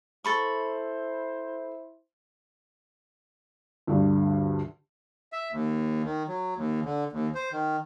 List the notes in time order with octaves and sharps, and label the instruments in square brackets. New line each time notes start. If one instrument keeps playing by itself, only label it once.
[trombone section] E4 C5 [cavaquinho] A4 B5 C#6
[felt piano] D2 G2 D3
[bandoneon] E5
D#2
D#3
F#3
D#2
D3
D#2
C5
D#3